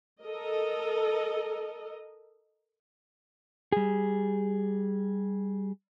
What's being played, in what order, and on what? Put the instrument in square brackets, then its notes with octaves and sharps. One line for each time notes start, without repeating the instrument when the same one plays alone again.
[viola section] A4 A#4 D#5
[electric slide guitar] G3 G#4